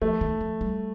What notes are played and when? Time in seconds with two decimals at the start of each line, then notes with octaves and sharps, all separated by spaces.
0.02 F3 A3
0.21 D#3
0.41 F3
0.61 G3